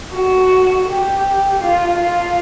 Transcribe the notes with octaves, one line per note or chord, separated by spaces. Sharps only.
F#4
G4
F4
F4